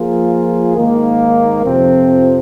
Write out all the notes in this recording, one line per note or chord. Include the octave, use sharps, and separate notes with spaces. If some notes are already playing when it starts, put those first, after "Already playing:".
Already playing: F3 A#3 F4 G#4
G#2 D#3 A#3
F2 C3 F3 C4